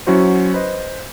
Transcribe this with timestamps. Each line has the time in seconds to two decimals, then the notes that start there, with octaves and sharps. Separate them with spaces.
0.07 F#3 C#4 E4 F#4 C5
0.54 B4 C5 D#5